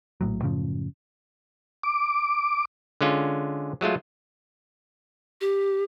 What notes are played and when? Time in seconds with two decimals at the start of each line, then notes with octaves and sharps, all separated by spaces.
0.21 A#1 A2 F#3
0.42 F#2 A2 C#3 F3
1.83 D6
3.01 D3 G#3 C#4 F4
3.81 F#3 G#3 A3 F4
5.41 G4